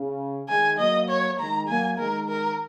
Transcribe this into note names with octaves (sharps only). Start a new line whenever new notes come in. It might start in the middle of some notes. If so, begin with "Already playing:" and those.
Already playing: C#3
D#3 G#3 G#5
F#3 A#3 D#5
C#5
D#3 G#3 A#5
F#3 A#3 G#5
D#3 G#3 A#4
A#4